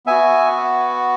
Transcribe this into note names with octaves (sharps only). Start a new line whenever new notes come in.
B3 F#4 E5 G#5